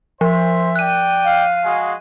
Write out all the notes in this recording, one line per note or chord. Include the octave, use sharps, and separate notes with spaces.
F3 C5 E5
D5 G5 F#6 D#7
F5
G#3 F#4 G#4